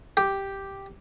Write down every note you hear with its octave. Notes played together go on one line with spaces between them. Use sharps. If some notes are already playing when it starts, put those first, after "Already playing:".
G4